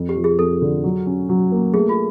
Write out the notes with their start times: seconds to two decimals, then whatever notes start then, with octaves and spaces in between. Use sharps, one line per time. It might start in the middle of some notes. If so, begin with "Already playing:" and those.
Already playing: F2
0.09 G4
0.16 F3
0.24 G#4
0.39 F2 A4
0.61 D3
0.84 F#3
1.07 C#4
1.29 F#3
1.52 A#3
1.74 A3 G#4
1.89 F4